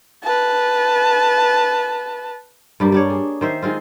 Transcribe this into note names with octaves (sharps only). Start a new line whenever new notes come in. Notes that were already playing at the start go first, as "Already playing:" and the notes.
B4 A5
G2 G3 A#3
G3 D4 C#5
G#4
D#3 C5 E5
D#3 G#3 C4 F4